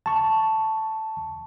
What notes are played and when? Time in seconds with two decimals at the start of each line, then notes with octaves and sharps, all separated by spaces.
0.06 A5 C#6